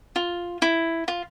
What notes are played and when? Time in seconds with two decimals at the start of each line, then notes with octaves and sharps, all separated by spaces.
0.16 F4
0.62 E4
1.08 F4